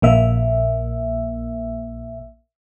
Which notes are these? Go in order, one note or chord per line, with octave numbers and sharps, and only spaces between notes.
A#1 A#3 E5